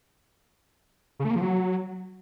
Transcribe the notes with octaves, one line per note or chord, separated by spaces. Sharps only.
C#3
A3
A#3
F3
F#3